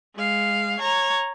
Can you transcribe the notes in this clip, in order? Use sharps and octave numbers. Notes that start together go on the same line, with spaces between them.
G#3 F5
C#5 A#5